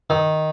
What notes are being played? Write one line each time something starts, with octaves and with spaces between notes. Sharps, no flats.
D#3